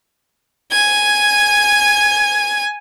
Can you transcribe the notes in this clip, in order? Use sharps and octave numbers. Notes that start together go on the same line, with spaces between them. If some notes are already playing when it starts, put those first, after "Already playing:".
G#5 G#6